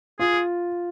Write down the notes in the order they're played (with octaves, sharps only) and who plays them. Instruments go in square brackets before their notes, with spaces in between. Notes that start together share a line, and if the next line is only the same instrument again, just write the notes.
[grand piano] F4 [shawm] G#4